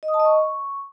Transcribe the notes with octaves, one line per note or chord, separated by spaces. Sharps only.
D#5
D#6
A5
D#5
C#6